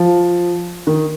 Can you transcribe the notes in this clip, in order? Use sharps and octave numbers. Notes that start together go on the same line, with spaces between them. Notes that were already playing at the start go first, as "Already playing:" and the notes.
Already playing: F3
D#3